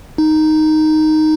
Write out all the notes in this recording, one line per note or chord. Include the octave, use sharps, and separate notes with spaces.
D#4